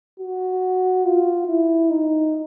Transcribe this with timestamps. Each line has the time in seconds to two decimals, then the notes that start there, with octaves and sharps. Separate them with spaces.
0.19 F#4
1.05 F4
1.47 E4
1.90 D#4